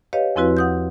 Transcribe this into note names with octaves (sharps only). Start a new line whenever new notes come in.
G4 B4 C#5 D#5 F5
E2 F3 C4 E4 F#4 B4
F#5 D#6 G6